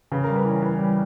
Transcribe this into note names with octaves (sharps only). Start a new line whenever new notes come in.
C#3 B4
G3 A#4
B4
E3 C#5
E3 B4
G3